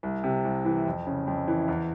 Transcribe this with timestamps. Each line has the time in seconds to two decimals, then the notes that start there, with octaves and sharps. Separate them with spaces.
0.03 C2
0.24 C3
0.45 C2
0.65 E3
0.86 F2
1.07 C#3
1.27 F2
1.48 E3
1.68 E2